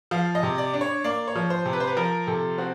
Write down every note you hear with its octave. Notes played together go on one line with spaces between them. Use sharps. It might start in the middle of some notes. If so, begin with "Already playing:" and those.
F3 F5
D#5
C3
D5
D4
C#5
A#3 D5
C#5
F3
C5
C3
B4
C5
B4
F3 A#4
C3 A4
C4 F#4